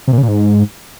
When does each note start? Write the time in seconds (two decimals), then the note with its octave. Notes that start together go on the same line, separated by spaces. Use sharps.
0.08 C3
0.13 A#2
0.18 C#3
0.23 A#2
0.28 G#2